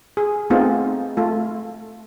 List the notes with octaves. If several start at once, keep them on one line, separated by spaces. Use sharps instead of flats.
G#4
A3 B3 C4 D#4 F4 G#4
A3 F4